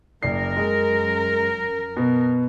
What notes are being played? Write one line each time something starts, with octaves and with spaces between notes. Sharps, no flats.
F#1 F#2 A#4 D5 C7
G#3
B2 B3